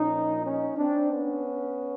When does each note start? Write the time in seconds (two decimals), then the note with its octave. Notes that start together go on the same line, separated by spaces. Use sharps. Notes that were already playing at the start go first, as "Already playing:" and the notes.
Already playing: A#2 F3 C#4 D#4
0.45 C#4 D#4
0.77 C4 D4
1.11 B3 C#4